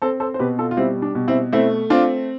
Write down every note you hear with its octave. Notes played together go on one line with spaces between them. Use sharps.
C4 A4 C5
A4 C5
C5
B2 G4 B4
F4 A4
F4
G3 C4 E4
D4
B2
C4 E4
A3 C4 E4
C4 D4 F4